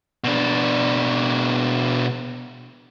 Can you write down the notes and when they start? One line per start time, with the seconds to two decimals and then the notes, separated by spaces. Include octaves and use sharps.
0.24 B2 D4